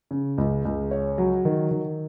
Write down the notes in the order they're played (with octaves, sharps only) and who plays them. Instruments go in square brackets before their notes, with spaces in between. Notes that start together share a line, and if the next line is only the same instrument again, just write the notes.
[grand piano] C#3
C#2
C#2
C#5
F#3
D#3
D#3